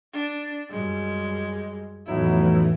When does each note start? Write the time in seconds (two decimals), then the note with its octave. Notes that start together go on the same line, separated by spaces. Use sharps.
0.14 D4
0.70 F#2 G3 G#3
2.06 F2 A2 E3 F#3 B3 D#4 E4